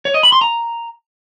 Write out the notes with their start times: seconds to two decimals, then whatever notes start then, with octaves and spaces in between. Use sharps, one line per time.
0.05 C#5
0.14 D#5
0.23 B5
0.32 C6
0.41 A#5